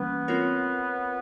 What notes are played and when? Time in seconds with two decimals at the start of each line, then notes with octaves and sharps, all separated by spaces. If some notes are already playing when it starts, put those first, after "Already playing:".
Already playing: E3 G3 A#3 B3 C#4
0.28 C4 F4 A#4 C#5